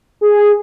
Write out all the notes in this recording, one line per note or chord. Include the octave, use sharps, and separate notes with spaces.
G#4